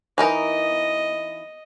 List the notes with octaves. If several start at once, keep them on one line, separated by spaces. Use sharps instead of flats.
E3 D#4 A#4 D#5